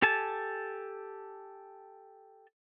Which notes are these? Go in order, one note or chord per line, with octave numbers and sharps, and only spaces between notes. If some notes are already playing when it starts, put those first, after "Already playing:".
G4 A4 G#5 A5